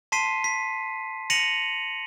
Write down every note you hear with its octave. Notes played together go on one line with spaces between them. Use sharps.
A5 C6 B6 C7 D#7
B6
A#6 C#7 D#7 F7 F#7